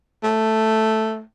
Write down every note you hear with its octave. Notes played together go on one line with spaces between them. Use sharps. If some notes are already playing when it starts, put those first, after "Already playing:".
A3